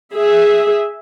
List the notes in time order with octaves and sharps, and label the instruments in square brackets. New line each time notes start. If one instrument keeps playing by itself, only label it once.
[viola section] G#4 E5